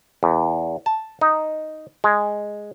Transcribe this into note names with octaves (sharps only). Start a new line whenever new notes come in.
E2
A5
D#4
G#3